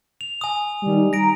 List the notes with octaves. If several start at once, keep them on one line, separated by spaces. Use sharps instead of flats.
F7
G#5 D#6
D#3 G3
A#5 A#6 D7